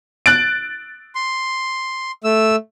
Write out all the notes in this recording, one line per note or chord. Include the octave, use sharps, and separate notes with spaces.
F#6 A6 D7
C6
A3 E6